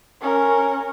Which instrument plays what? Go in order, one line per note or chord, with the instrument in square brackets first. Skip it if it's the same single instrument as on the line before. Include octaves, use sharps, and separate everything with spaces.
[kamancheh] C#4 A#4